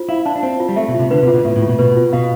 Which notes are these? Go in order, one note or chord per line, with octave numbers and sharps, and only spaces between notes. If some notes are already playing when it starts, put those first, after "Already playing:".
Already playing: F4 C5
E4 F5
D4 A5
D4
C4 C5
F4
G3
A3 E5
B2
C3 F4
D3 B4
C3
F4
B2
A2 E5
A2
F4
B2
B2 B4
F4
B2 F5